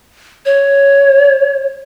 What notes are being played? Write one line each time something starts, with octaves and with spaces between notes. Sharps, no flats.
C#5